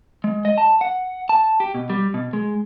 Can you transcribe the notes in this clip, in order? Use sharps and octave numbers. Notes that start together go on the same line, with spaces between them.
G#3
D#5
A5
F#5
A5
G4
B2
G3
B2
G#3